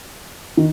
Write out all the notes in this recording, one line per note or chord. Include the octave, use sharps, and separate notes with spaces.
D#3